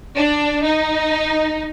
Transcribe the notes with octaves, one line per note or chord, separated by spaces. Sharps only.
D4
D#4